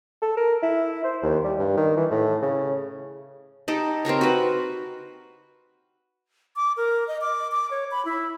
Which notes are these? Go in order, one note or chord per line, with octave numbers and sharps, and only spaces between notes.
A4
A#4
E4
C5
D#2
G3
G2
D#3
E3
A2
C#3
D#4 G4 A4
C4 G4 A#4 C#5
F#4 B4
D6
A#4
D#5
D6
D6
C#5
B5
E4